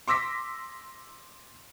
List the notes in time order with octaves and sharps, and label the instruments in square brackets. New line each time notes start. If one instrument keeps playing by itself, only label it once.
[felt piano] C6 D6 E6 A#6 B6